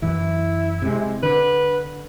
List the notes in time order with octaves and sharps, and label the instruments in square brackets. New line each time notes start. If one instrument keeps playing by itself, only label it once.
[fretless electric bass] F#2 E3 [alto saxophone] E4
[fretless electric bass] C3 G#3
[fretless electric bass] D3 [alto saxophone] B4